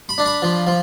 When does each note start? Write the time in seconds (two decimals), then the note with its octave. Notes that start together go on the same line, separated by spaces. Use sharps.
0.09 B5
0.18 D4
0.26 B5
0.42 F3
0.67 F3